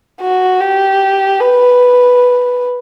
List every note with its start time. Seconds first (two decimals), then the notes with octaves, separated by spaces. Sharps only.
0.21 F#4
0.60 G4
1.40 B4